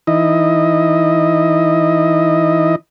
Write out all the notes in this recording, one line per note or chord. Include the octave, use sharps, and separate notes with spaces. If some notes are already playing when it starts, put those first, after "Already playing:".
E3 D#4 E4 D#5